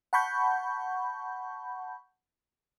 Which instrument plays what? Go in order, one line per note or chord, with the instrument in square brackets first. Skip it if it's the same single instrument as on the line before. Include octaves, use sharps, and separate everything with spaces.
[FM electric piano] F#5 A5 B5 C#6 G6